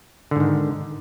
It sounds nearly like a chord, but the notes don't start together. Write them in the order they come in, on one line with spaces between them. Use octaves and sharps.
D3 G#2 D#3